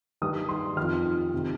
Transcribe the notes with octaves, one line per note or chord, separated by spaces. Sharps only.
G2 D#3 D#6
C6
F2 D#3 F6
C3 D#3